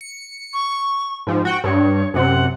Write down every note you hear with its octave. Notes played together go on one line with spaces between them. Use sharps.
C#7
C#6
G#2 F3
F#4 F#5 G5
G2 C#5
F#2 C3 F#5